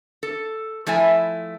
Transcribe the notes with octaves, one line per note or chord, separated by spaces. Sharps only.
A4
F3 A3 E4 E5 G#5